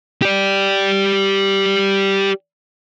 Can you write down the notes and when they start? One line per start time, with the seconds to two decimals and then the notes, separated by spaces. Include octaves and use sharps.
0.22 G4 D5